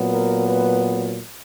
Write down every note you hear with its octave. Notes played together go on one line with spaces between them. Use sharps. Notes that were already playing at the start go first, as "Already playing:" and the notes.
Already playing: A#2 F#3 B3
A#4
B4